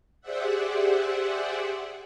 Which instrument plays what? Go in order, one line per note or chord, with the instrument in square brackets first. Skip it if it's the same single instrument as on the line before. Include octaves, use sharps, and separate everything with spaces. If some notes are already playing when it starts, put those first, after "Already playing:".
[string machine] G4 G#4 C5 D5 E5 F#5